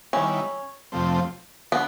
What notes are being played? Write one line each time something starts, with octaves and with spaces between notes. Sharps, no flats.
D#3 G3 B3 C#4 E4
F2 C3 F3 A3 C4
D3 B3